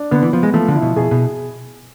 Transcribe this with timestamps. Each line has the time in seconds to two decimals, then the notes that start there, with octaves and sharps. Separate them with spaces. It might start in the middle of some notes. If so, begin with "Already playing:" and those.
Already playing: D4
0.11 D3 B3
0.23 E3
0.33 F3 B3
0.43 G#3
0.54 F3 A3
0.68 D3
0.75 E4
0.82 B2
0.96 B2 G#4
1.11 B2